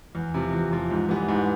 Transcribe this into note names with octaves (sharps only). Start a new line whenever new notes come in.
E2
C3 F3
E2
C3 F3
G#2
E3 G3 B3
G#2